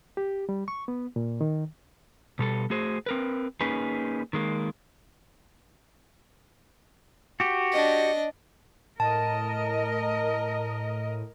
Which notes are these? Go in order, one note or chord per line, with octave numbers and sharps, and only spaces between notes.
G4
G3
C#6
B3
A#2
D#3
B2 G3 A4
A3 F#4 G#4 C5
C4 A#4 B4
A#3 C#4 D#4 G#4 B4
D#3 G#3 A#3
F#4 G4
D4 D#5
A2 A#4 D#5 A5